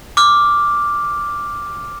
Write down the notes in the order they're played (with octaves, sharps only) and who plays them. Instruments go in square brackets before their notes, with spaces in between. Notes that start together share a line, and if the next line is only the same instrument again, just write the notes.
[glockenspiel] D6 F6